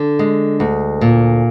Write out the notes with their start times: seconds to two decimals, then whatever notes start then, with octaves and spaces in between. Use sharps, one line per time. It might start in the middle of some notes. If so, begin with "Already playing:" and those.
Already playing: D3
0.19 G#3
0.60 D2
1.01 A#2